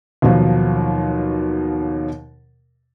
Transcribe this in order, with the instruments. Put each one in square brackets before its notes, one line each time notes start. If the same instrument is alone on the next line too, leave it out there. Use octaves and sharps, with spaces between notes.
[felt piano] D#2 B2 F3 F#3